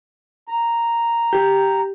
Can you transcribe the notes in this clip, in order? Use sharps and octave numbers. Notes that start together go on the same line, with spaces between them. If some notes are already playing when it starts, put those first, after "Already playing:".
A#5
G4